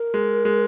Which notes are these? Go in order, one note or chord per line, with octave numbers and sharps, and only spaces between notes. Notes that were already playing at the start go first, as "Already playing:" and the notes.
Already playing: A#4
G#3
G#3